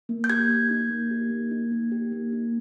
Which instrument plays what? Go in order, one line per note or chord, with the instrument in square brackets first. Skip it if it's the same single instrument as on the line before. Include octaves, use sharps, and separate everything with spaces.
[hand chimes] A#3
G6
G4 G#6
A#3
D#4
A#3
G4
A#3
D#4
A#3
G4
A#3
D#4